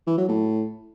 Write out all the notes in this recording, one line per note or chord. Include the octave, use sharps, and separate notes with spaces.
E3
F#3
A2